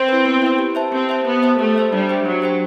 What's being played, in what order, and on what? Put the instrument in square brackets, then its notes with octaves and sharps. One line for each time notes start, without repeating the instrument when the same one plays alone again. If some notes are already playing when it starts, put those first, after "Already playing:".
Already playing: [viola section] C4
[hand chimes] E4 B4
B3
E4 B4
G4
C5 E5 A5
[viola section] C4 [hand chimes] G4
[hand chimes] C5 E5 A5
[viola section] B3 [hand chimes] G4
[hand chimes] C5 E5 A5
[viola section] A3 [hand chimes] G4
[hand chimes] C5 E5 A5
[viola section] G3 [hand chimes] D4
[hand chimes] G4 C5 G5
[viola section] F#3 [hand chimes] D4
[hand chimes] G4 C5 G5